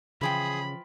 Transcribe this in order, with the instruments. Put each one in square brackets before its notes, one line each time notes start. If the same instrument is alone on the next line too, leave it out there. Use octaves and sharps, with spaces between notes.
[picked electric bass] C#3 [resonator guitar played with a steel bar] E3 F3 G5 [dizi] G#4 [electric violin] B5